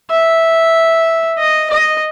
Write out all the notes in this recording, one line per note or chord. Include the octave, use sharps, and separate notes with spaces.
E5
D#5
D#5